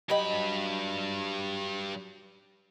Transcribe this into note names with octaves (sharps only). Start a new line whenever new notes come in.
G2 F#3 G4 D#5 B5